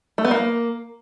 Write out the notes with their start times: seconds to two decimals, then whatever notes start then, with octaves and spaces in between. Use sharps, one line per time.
0.18 A3
0.25 B3
0.31 A#3